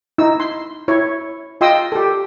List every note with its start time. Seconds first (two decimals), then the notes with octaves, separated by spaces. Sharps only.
0.18 D#4 E4 E6
0.40 C6
0.88 E4 C#5
1.61 F4 D#5 G5 C6 D#6 E6
1.92 G4 A4